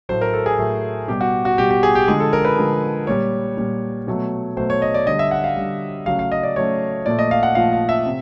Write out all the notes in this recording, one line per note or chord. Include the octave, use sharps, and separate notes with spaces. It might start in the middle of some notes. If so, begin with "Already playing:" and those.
A2 F#3 A3 C5
A#4
A4
G#4
A2 F#3 A3
B2 G3 G4
F#4
F#4
B2 G3 G4
G4
G#4
G4
D3 F3 G#3 G#4
A4
A#4
B4
D3 F3 G#3
A#2 G3 C#5
A#2 G3
B2 F#3 A3
B2 F#3 A3 C5
C#5
D#5
D5
D3 G3 D#5
E5
F#5
F5
D3 G3
C#3 F#3 A3 F5
F5
D#5
D5
C#3 F#3 A3 C#5
A#2 F3 A3 D5
D#5
F5
F#5
A#2 F3 A3 F5
F5
E5
C3